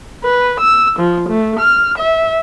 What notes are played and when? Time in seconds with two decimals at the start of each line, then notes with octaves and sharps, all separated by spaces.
0.23 B4
0.59 E6
0.99 F3
1.29 A3
1.60 F6
1.98 E5